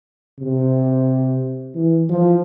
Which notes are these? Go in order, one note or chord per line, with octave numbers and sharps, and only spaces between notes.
C3
E3
F3